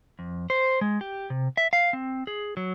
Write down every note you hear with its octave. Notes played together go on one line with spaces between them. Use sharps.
F2
C5
G#3
G4
C3
E5
F5
C4
G#4
F#3